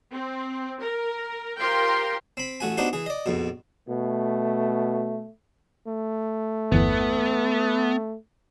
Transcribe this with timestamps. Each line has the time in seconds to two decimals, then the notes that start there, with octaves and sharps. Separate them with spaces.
0.12 C4
0.80 A#4
1.59 F4 G4 A#4 C5 G5 C6
2.37 C4 B5
2.60 A1 A3 F#4 G#5
2.77 B3 D4 D#4 F#4 G4 C5
2.93 E3 G#4
3.06 D5 D#5
3.26 A#1 F2 B2
3.89 B2 A3
5.87 A3
6.72 G1 E2 E3 B3